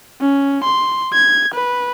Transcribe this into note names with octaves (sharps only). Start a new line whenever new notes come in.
C#4
C6
G#6
B4